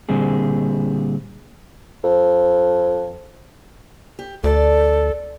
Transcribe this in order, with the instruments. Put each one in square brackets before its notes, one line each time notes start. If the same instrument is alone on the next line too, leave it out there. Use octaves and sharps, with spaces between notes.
[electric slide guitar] A#2 D3 G3 C4 G#4
[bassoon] F2
[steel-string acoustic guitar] G4
[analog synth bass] D2 [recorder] A4 [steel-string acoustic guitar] D5